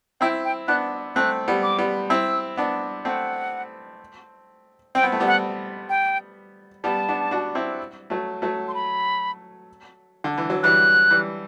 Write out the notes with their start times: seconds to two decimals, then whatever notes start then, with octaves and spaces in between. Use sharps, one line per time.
0.21 C4 E4 G5
0.45 G5
0.68 B3 D4 F#6
1.16 A3 C4 F#6
1.48 G3 B3
1.63 D6
1.78 G3 B3
2.10 C4 E4 E6
2.57 B3 D4
3.05 A3 C4 F#5
4.95 C4 G5
5.03 B3
5.12 A3
5.20 G3 B3
5.27 F#5
5.89 G5
6.84 G3 B3 A5
7.09 B3 D4
7.31 D4 F#4
7.55 C4 E4
8.10 F#3 A3
8.42 F#3 A3
8.68 C6
8.74 B5
10.24 D3
10.38 E3
10.50 F#3
10.63 E3 G3 F#6
11.11 E3 G3